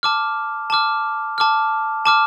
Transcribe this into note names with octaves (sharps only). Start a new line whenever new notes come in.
A5 D6 F6
A5 D6 F6
A5 D6 F6
A5 D6 F6